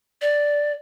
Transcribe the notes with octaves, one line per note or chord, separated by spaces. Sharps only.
D5